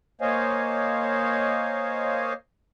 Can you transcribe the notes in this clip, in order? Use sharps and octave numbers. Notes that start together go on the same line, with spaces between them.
A#3 C5 C#5 D#5 F5 G#5